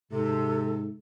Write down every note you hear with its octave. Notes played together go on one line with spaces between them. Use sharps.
G#2 C3 A4